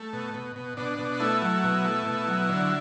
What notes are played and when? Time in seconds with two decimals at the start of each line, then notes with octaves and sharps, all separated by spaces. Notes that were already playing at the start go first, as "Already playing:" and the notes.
Already playing: A3
0.13 B2
0.34 B2
0.56 B2
0.77 B2 D4
0.99 B2
1.20 A3 E4
1.42 F#3
1.63 B2
1.85 A3
2.06 B2
2.27 F#3
2.49 D3